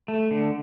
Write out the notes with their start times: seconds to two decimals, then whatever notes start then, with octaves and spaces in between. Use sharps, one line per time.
0.08 A3
0.31 D3